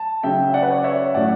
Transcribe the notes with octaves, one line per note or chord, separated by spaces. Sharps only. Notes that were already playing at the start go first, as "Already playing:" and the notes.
Already playing: A5
C#3 F#3 C#4 E5 G5
D5 F#5
B4
C#5
D5
C#5 E5
A2 F#3 C#4 D5 F#5